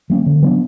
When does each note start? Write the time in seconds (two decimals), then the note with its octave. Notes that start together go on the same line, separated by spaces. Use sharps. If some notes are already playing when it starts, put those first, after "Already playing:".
0.10 F#3 A#3 C#4
0.26 D3
0.43 F#3 B3 D4